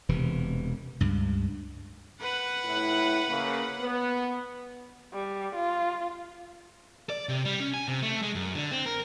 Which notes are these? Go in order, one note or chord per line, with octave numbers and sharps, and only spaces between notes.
E1 C3 E3
C#2 G2
B4 F#5
A2 E4
C#3 A#3
B3
G3
F4
D5
C3
G3
C#4
G#5
C3
A3
G#3
F#2
D3
C4
A#4